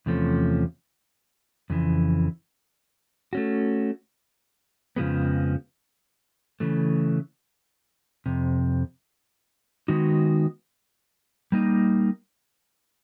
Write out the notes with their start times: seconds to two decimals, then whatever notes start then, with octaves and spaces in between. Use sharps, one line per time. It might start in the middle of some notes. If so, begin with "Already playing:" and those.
0.06 E2 C3 F3 A3 C#4
1.70 F2 C#3 E3
3.33 A3 C#4 F#4
4.96 F2 C#3 F3 G#3 B3
6.60 C#3 E3 A3
8.26 F2 C3
9.88 D#3 G#3 B3 D#4 F#4
11.52 G3 A#3 D#4